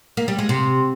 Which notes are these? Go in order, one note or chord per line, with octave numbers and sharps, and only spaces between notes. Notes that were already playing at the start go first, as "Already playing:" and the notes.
A#3
G3
G#3
C3